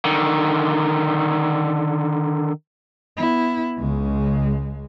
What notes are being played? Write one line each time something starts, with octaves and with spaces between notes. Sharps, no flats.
D3 D#3
B3 E4
C#2 C#3 G#3